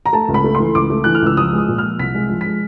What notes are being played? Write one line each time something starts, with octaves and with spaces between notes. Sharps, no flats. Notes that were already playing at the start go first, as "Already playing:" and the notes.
A#5
A3 A5
C#2
B5
A3
C6
E3
C#2 D6
A3
E3 F#6
F6
C#2 E6
F3 D#6
G#3 D#6
A#2
F6
F3
C2 B6
G#3
F3
B6
G#3